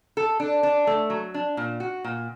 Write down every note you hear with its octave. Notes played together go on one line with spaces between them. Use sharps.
A4
D4
D4
A3
F#3
D4
A#2
F#4
A#2